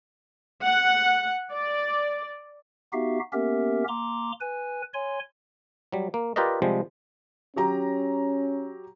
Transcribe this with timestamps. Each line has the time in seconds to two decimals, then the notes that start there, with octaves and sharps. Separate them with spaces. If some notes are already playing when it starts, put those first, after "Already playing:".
0.61 F#5
1.53 D5
2.93 B3 D#4 F#4 G4 E5 F5
3.33 A#3 B3 C#4 G4 A#4 E5
3.88 A#3 A#5 C6 D6
4.41 B4 G#5
4.94 C#5 G#5 C6
5.92 F#3 G3
6.14 A#3
6.36 F4 G4 A#4 B4 D5 D#5
6.62 C3 F3 G3 G#3
7.56 F#3 C#4 G4 A#5